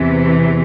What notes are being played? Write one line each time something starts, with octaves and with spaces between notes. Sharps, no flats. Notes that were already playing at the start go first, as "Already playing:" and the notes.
Already playing: E2 C3 E3